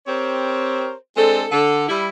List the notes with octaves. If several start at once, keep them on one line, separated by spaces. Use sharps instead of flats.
C4 G4 A#4 C5 C#5
G#3 C4 D4 A4
D3 A4
G3 E4